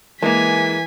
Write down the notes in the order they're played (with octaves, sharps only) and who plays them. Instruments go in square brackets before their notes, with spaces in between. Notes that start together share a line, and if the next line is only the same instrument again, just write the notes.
[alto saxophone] E3 [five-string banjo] G#3 A#3 [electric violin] G#5 B6